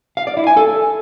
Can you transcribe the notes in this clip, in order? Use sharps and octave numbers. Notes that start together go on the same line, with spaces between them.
F5
D5
E4
G#5
A4